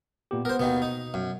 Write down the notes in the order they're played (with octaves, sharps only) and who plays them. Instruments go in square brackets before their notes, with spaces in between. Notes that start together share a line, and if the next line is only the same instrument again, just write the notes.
[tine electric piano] A#2 B3 G4
[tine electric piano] B3 [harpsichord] A#4 C5
[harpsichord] D#2 D#3 B3 [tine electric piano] B2
[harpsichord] D#4
F#2